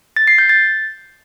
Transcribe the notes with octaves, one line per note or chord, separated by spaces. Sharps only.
A6
C7
G6
A6